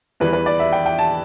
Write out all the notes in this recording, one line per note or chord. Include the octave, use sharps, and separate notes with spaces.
E2 E3 G3 B4
B4
D5
E5
G5
G5
A5